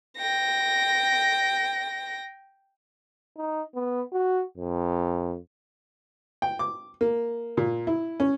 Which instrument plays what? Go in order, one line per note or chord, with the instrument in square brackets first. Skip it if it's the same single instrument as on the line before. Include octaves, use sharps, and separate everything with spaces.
[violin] G5 A#6
[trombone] D#4
B3
F#4
F2
[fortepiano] G5
D6
A#3
A#2
E4
C#4